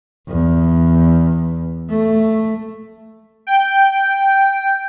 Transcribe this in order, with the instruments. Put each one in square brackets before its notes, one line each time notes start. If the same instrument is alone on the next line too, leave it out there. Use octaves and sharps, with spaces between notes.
[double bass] E2
A3
[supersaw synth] G5